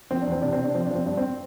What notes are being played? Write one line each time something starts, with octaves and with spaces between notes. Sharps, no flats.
F3 C4
E2 D4
C4
C3 D4
C4
C3
D4
F3 C4
D4
F3 C4
G2 D4
C4